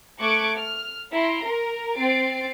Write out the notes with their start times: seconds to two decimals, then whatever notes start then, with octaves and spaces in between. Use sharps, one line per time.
0.19 A3 C#6 D6 F#6 G#6 D7
0.58 F6
1.12 E4 A#5 C6 D7
1.44 A#4
1.96 C4 A6 C7 D7